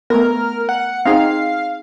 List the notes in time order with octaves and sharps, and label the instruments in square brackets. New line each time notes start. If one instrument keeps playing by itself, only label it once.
[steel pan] A3 B3 [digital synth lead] A#4
[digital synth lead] F#5
[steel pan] C4 D#4 G#4 [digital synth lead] F5